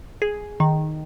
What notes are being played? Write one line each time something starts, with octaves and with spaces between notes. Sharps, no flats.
G#4
D#3